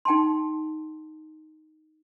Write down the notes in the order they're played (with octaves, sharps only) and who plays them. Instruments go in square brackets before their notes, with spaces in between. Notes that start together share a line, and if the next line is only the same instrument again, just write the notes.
[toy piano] D#4 G5 A5 C6